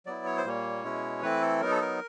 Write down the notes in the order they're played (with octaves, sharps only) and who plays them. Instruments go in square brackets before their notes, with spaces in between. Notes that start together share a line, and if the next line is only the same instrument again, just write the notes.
[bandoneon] F#3 B3 E4 D5
C#5
C5
A#2 G3 A#3 C#5
B2 G#3 C#4 E4
E3 A3 C4 E4 B4
A4
F#3 B3 D#4 A#4
A4
A#4